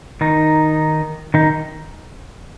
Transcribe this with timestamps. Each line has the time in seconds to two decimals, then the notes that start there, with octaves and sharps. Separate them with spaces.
0.21 D#3 D#4
1.34 D#3 D#4